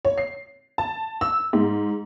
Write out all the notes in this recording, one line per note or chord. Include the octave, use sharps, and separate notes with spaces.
C#5
C7
A5
E6
G#2